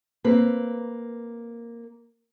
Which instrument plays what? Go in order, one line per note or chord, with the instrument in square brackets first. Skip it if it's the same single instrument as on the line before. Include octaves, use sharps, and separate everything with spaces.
[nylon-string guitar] A#3 C4 B4